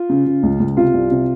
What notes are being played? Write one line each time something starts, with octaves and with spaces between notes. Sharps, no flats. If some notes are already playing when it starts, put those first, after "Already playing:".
Already playing: F4
C#3
C#3
C#2
C#2
C3 F4
C2
C3